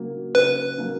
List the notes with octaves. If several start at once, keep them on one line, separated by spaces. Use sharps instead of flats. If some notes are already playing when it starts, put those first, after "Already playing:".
Already playing: C#3 F#3 A#3
C#3 B4
F#3 A#3